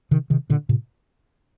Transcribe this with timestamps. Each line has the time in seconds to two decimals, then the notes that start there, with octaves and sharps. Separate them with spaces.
0.11 C3 D#3
0.30 C3 D#3
0.50 A#2 D3
0.69 A2 C3